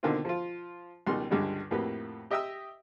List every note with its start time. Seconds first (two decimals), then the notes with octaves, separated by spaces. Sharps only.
0.03 B2 D3 D#3 A#3 C4 F4
0.25 F3 F4
1.07 C#2 B2 D#3 G3 C6
1.30 C#2 G2 D3 G3 G#3
1.71 F2 A2 A#3 F#4 G4 B4
2.31 G4 D#5 E5 G5 D#6 E6